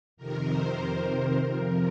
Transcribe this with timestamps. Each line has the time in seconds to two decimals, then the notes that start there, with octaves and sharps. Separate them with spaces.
0.17 F2 C3 D#3 A#4
0.47 C5
0.77 A#4
1.38 F2 C3 F3